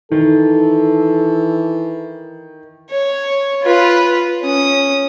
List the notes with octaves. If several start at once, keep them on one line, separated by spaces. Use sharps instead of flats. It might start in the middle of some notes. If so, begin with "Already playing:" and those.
D#3 E3 A4
C#5
F4 B4
C#4 D#6